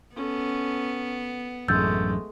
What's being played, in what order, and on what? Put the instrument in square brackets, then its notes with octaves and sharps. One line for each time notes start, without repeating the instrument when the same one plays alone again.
[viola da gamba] B3 [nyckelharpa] C#4 A4
[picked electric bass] A1 F#2 [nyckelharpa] G#3 A3 [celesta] E6 G6 A6